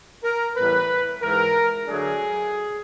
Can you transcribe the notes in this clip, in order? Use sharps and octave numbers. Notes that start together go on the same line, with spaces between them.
A#4
A2 E3 G3 B3 B4
G#2 E3 G#3 A#4
D3 F#3 A3 D4 G#4